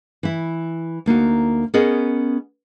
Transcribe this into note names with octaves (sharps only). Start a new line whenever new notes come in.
E3 E4
D2 A#3 D#4 F#4
B3 C#4 G#4 A#4 D#5